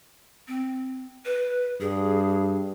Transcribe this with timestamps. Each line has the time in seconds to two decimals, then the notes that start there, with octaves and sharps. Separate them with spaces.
0.48 C4
1.25 B4
1.81 G2 G#4